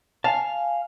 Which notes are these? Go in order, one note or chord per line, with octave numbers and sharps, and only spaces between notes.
F5 G#5 A5